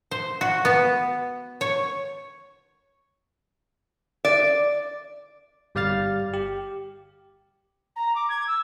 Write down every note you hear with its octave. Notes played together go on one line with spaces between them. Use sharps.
C5
F#4
B3
C#5
D5
G1 G3 D5 F5 F6 A6
G4
A#5
D6
G#6
E6